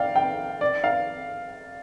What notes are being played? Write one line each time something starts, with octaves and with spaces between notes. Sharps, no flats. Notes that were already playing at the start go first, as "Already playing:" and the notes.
Already playing: D5 F5 G5
G5
D5
F5